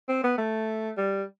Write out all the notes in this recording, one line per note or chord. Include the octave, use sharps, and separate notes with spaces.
C4
B3
A3
G3